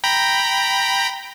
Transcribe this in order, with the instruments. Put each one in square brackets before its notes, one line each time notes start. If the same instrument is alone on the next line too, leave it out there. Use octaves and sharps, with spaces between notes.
[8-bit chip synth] G5 A#5 B5